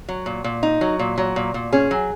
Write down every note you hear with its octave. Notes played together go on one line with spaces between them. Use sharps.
F#3
A#2
A#2
D#4
F#3
A#2
F#3
A#2
A#2
C#4 G#4
F#3